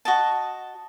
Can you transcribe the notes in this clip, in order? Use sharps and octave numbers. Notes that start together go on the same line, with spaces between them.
F#4 D#5 A5